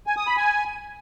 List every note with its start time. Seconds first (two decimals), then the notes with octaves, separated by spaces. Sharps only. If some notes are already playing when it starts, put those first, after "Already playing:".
0.07 G#5
0.17 D#6
0.27 B5
0.37 G#5